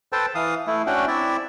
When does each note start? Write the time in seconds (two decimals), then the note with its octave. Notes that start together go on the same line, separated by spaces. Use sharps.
0.13 A4 B4 C5 G5 A5
0.35 E3 F5 D#6
0.67 A3 E4
0.87 C#4 D4 F#4 F#5 G5
1.08 C4 E4 D5 E5